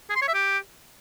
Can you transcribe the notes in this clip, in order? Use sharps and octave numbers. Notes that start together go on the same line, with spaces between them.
G#4
C6
C#5
E5
G4